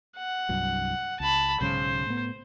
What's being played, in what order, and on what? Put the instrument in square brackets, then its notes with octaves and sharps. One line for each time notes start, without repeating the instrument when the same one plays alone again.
[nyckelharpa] F#5
[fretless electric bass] C2 G2 F#3
[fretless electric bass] C#2 [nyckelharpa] A5 B5
[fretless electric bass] B1 G#2 C#3 [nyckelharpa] C5
[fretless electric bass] A2 B3